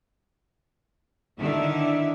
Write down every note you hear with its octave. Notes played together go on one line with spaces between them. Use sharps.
D3 D#3 E4 E5